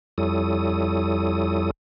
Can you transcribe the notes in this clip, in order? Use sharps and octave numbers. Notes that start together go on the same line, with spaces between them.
F2 G3 E4 A4 C#5 D#6